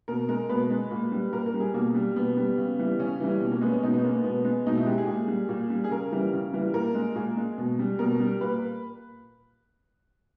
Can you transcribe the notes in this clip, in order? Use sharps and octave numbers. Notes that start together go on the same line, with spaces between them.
B2 A#4
G#3 A#4
B2 B4
G#3
A#2
G3
A#2 A#4
A#4
G3
G#4
B2 A#3
G3
B2 B3
G3
C#3
E3 G3
C#3 C#4
E3 G3
B2
A#3
G#3 B3
C#4
B2 D#4
B3
G#3 A#3
B3
B2 B3
G#3
B2 D#4
E4
G#3 G4
G#4
A#2
G3
A#2
G3
G#4
C#3 A#4
E3 G3
C#3
E3 G3
A#2 A#4
G#3
A#2 G#4
G#3
B2
G3
B2 A#4
G3
A#2 B4